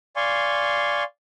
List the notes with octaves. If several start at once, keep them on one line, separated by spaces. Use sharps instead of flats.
D5 F5 G#5 C6 C#6